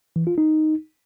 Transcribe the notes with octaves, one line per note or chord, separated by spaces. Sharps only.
E3
F4
D#4